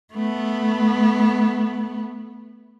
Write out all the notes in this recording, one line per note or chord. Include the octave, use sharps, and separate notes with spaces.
A3 B3